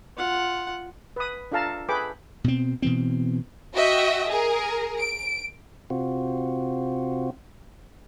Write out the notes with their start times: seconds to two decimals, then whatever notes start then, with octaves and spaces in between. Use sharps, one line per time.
0.17 F4 F#5
1.16 B4 D#6
1.52 D4 F4 A4 F5 A5 A#5
1.89 G#4 A4 B4 G5 B5 D6
2.44 B2 C4
2.82 B2 E3 C4
3.75 F#4 D#5 E5 G5
4.29 G#4 A#4
4.99 D7
5.90 C3 C4 F4 F#4